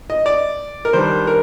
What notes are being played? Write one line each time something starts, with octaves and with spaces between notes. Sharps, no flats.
D#5
D5
A#4
D#3 G3 D4 C5
A#4